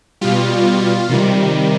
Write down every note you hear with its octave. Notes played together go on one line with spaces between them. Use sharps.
B2 G3 F4
C3 D#3 G3